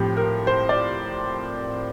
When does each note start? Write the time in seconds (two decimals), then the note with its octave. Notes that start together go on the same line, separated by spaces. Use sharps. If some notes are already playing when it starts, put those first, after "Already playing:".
Already playing: A2 F3 C4 G4
0.17 A#4
0.47 C5
0.69 D5